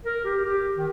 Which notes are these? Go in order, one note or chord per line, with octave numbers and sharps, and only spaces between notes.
A#4
G4
G4
D#3